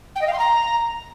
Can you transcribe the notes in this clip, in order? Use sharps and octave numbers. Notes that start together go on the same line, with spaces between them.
G5
D#5
F5
C6
A#5